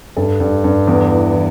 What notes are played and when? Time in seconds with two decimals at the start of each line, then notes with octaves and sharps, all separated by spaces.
0.17 G2 A4
0.40 G2
0.64 G2
0.87 E2
1.11 E3
1.35 E3